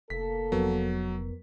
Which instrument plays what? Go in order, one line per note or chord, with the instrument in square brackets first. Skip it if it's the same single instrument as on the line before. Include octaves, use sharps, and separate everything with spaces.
[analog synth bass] F1 [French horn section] A#3 A4 [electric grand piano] B6
[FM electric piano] F2 B3 A#4 [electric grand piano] F#3